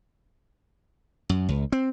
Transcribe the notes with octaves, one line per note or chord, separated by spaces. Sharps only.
F#2
C#2
C4